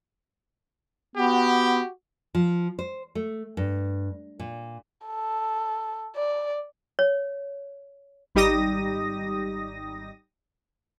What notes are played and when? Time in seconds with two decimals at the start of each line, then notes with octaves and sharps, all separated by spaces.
1.16 B3 F#4 G4
2.35 F3
2.79 C5
3.15 A3
3.57 G2
4.40 A#2
5.06 A4
6.16 D5
6.99 C#5
8.35 G#1 G3 D#4 G4 D#6 A#6